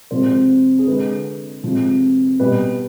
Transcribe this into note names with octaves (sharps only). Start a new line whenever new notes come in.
C3 F3 G#3 C5
G#4
D3 G#3 B4
C3 F3 G#3
B2 G3 B4